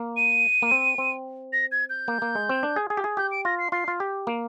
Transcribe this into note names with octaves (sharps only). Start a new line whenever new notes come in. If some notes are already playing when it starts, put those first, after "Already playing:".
Already playing: A#3
D#7
A#3
C4
C4
A#6
G#6
G6
A#3
A#3
G#3
C4
D4
G#4
G#4
G4
G#4
G4 G6
D7
F4 A#6
C7
F4 C7
F4
G4
A#3